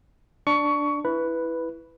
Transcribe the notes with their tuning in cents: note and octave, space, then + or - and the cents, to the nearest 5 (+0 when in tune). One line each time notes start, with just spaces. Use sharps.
D4 +0 C#6 +20
E4 +0 B4 +0